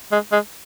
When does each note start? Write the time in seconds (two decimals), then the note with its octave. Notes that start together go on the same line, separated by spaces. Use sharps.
0.12 G#3
0.32 G#3